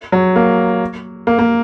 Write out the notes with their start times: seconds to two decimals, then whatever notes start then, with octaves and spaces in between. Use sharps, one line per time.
0.12 F#3
0.36 A#3
1.27 A#3
1.39 A#3